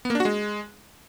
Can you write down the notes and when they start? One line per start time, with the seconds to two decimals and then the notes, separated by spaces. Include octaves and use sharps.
0.05 B3
0.10 A#3
0.15 D4
0.20 F#4
0.25 G#3